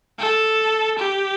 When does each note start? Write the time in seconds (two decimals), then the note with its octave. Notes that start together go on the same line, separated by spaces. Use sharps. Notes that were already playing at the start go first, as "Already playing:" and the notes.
0.19 A4
0.98 G4